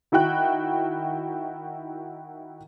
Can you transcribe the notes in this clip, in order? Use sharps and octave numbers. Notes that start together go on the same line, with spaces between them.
D#3 E4 F#4 G5 F#6